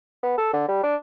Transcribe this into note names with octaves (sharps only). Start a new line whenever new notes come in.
B3
A4
D3
G3
D4